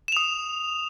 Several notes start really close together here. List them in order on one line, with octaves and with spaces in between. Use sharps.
E7 F7 D#6